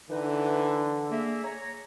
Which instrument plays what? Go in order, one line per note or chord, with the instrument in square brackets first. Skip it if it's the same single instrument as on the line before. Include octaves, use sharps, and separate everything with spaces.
[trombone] D3 [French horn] E3 [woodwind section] D#4 B4
[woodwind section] A#3 E5 [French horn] G#4
[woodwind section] C#5 A#5